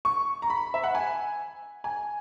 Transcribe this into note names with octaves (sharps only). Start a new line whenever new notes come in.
C#6
A#5
B5
E5
F#5
G#5
G#5